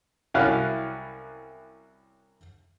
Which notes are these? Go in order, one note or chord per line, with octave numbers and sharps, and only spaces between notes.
C2 F#3 C#4 E4 F5 F#5